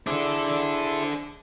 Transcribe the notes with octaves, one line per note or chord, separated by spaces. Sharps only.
D4 E4 G#4 A4 C5